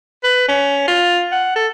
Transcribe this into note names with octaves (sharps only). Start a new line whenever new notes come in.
B4
C#4
F4
F#5
A4